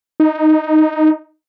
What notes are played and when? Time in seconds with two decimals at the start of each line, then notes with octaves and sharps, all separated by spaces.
0.20 D#4